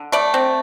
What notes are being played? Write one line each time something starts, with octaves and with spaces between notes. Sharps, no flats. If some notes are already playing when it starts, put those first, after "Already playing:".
Already playing: D3
A3 D5
C4